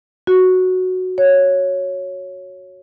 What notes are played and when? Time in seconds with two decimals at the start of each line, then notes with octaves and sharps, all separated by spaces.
0.27 F#4
1.18 C#5